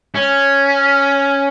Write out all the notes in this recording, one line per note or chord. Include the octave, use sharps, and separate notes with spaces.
C#4